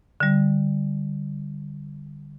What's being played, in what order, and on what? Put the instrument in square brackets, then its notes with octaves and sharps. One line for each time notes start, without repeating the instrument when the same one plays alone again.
[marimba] D3 G3